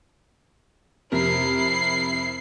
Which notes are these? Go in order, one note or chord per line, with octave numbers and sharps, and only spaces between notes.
F2 C3 E4 A#4 C7